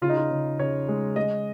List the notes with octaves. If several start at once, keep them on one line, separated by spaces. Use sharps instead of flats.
C#3 F4
D#4
F4
C#3
C#3 C#5
G#3
G#3 D#5